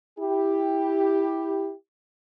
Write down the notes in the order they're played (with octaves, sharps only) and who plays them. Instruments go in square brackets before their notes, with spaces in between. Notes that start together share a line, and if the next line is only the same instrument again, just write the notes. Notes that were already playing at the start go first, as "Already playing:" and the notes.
[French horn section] E4 G4